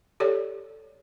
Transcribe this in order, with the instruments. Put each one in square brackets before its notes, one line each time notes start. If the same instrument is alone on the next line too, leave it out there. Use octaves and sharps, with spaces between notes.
[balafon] G4 A4 C#5 D5